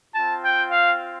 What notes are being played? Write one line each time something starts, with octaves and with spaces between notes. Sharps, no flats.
C4 F4 A5
G5
F5